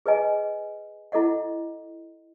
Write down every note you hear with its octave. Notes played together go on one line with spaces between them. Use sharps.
G#4 B4 D#5 G#5
E4 A4 D#5 F#5